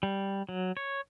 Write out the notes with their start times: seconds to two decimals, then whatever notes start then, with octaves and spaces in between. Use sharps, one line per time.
0.03 G3
0.49 F#3
0.77 C#5